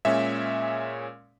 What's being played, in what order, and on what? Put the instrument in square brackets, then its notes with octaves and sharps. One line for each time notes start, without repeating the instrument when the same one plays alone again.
[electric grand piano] A#2 G#3 C#4 E5